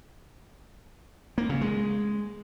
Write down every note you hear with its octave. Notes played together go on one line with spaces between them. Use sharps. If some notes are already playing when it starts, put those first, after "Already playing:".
A#3
C#3
G#3